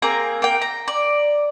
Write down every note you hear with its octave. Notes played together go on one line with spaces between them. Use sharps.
A#3 C4 G#4 A#5
A#3 G5
A#5
D5